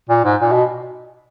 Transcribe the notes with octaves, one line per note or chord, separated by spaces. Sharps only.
A#2
G#2
A#2
B2